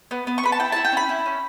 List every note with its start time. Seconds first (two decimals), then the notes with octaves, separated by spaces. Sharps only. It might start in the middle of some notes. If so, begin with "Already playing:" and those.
0.11 B3
0.27 B3
0.38 C#6
0.43 B3 B5
0.52 A5
0.60 E4 G5
0.72 E4 A5
0.85 G5
0.92 C#4 B5
1.09 E4
1.26 C#4